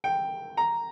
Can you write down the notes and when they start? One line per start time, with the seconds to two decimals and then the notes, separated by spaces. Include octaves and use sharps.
0.04 G5
0.57 A#5